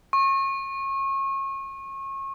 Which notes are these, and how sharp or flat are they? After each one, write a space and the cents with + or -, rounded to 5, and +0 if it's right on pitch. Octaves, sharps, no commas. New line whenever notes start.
C#6 -30